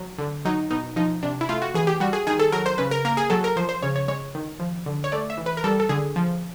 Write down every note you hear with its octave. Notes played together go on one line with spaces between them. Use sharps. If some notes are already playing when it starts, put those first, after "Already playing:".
Already playing: F#3
D3
F#3 D#4
B2 D#4
F3 D#4
C3 D4
E4
A3 F4
F#4
E3 G#4
G4
G3 F#4
G#4
D#3 G#4
A4
F#3 A#4
C5
C#3 B4
A#4
A#3 A#4
G#4
F#3 A4
A#4
F3 C5
C5
C#3 C#5
C#5
G#3 C#5
D#3
F3
D3
C#5
A3 D5
E5
E3
B4
A#4
G3 A4
A4
D3 G#4
F3